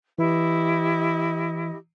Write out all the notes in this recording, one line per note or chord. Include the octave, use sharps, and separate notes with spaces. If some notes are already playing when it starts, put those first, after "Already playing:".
E3 E4 G4 D#5